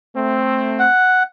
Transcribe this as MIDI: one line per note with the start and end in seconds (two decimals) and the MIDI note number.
0.15 0.86 57
0.15 0.86 60
0.79 1.23 78